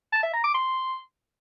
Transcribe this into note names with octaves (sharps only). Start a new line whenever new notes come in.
A5
E5
A#5
D6
C6